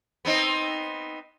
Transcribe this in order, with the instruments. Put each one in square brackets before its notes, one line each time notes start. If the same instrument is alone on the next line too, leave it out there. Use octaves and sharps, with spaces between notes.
[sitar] B3 C4 D#4